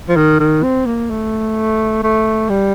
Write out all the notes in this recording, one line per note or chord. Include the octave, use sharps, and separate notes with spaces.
F3
D#3
D#3
C4
A#3
A3
A3
G3